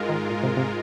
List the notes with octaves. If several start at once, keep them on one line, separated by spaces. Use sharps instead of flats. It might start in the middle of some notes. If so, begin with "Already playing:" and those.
Already playing: G#2 G#3 F4 A#4
D#3
A#2
C3
C3